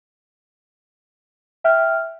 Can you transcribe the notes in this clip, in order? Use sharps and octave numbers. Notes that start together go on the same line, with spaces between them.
E5 G5 F6